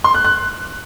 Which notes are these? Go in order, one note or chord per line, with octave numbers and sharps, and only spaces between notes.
C6
F#6
F#6